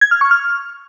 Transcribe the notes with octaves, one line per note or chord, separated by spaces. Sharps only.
G#6
F6
C#6
F6